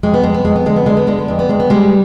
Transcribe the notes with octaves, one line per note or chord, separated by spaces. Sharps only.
F2 G#3
B3
F2 G#3
B3
F2 G#3
B3
D3 G#3
B3
D3 G#3
B3
D3 G#3
B3
F2 G#3
B3
F2 G#3
B3
G3 G#3